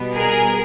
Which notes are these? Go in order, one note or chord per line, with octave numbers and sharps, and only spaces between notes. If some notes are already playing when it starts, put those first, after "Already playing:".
Already playing: B2 G3 B3
G#4 A#4